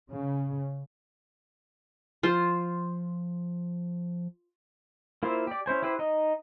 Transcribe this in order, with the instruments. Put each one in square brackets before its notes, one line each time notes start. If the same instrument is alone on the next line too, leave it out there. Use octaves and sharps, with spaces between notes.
[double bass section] C#3
[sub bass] F3 [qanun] F4 C5
[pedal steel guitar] A#3 E4 F4 C5 E5
G4 D5
C#4 E4 C5 G#5
E4 G4 B4 C5
D#4 D#5